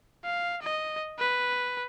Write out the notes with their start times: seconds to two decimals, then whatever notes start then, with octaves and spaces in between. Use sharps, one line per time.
0.25 F5
0.63 D#5
1.19 B4